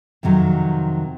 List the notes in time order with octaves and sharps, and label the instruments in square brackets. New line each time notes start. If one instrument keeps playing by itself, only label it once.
[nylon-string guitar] F2 C3 D#3 F#3